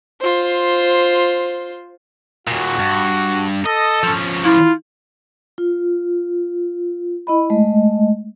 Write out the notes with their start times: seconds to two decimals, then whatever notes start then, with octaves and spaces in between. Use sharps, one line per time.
0.21 F4 C5
2.47 D#2 A#2 F#4
2.79 G2
3.66 A4 D#5
4.03 F3 C#4
4.44 E4 F4
5.58 F4
7.27 E4 D#5 B5
7.50 G#3 A3 D#5